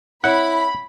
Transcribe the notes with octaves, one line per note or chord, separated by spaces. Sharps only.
C4 E4 C#5 F#5 B5